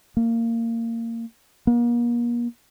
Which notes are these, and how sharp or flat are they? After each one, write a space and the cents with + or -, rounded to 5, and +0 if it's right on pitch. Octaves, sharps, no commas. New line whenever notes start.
A#3 -20
A#3 +40